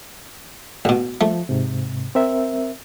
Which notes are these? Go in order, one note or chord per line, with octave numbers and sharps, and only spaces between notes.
A1 B2
F3 A3
G#2 C3
C4 A#4 E5